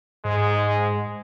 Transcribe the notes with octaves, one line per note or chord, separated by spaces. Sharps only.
G#2 G#3